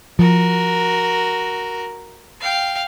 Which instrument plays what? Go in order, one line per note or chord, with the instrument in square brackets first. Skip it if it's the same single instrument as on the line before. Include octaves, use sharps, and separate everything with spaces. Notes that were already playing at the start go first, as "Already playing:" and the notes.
[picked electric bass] F3 [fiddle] F#4 A#4
[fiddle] F5 G5